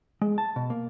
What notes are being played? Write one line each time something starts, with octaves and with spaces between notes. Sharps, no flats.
G#3
A5
B2
A#3